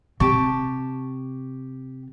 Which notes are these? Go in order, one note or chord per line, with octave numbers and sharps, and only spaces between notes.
C3 G4 A5 C#6